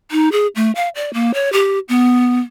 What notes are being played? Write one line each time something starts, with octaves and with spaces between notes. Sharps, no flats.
D#4
G#4
A3
F5
D5
A#3
C#5
G4
B3